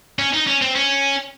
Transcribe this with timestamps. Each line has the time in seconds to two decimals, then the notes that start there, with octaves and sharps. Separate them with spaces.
0.19 C#4
0.33 D#4
0.47 C#4
0.62 C4
0.75 C#4